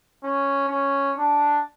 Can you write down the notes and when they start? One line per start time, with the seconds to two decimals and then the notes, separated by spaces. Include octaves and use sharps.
0.23 C#4
0.69 C#4
1.17 D4